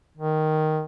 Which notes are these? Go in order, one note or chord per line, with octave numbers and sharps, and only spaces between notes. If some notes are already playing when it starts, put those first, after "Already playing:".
D#3